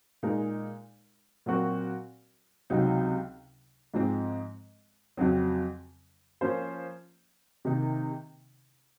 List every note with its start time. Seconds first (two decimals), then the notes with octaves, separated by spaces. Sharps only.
0.23 A#2 G#3 D#4 A#4
1.46 A#2 F#3 C4 F#4 A#4
2.70 C#2 C3 F#3 C4 D#4
3.94 G#2 F3 G#3 C4
5.17 F2 C#3 F#3 C4
6.41 F3 A#3 C#4 F4 C5
7.65 C3 D#3 A#3 D#4